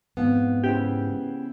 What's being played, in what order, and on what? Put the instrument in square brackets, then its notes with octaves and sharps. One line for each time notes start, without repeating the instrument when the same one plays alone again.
[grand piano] F2 F5 [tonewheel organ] G#2 [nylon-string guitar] B3
[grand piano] C#3 E4 C5 [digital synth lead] G4